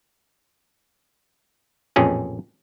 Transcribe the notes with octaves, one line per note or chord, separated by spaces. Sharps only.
A1 F2 A#2 C#4 G#4